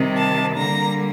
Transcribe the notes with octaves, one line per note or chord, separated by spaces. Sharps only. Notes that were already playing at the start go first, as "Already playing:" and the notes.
Already playing: C3 D#3 G3
A5
D3 G3 A#3 A#5